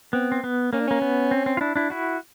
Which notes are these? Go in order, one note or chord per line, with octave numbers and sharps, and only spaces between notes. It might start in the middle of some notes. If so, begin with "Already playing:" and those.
B3 C4
C4
B3
A#3 C#4
D4
A#3 C#4
B3
C4
C4
F4
D4 E4
D4 E4
E4 F#4